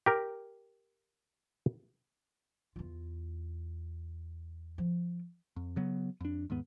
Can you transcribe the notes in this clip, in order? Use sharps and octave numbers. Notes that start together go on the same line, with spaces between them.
G4 A#4
E2 F4
F3
F2
C#3 F#3 B3
F2 D4
D#2 G#2 B3